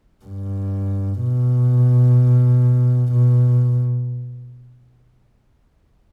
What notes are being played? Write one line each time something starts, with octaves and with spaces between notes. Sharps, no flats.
G2
B2
B2